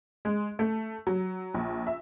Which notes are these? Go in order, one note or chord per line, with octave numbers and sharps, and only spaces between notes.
G#3
A3
F#3
A#1
E5